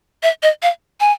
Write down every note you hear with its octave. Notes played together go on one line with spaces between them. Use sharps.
E5
D#5
F5
G#5